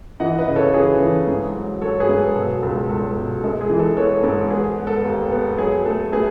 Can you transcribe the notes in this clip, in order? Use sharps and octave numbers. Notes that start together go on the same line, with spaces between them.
E3 D#5 F#5
B4 D#5
C#3
A4 C#5
E3 G#4 B4
E3
G#2
F#3
F#3 A4 C#5
G#4 B4
G#2
A4
B2 A4
C#2 A4
C#2 A4
B2
G#3 A4
G#4
E3
A4
B3 A4 C#5
G#2 A4
B3 G#4
B3
A4
D#2
B3
F#3 G#4
A3 A4
A3 G#4 B4